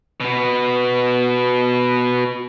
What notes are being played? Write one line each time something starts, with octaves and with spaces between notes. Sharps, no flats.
B2 B3